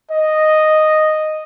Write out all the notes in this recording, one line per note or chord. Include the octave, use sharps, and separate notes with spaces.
D#5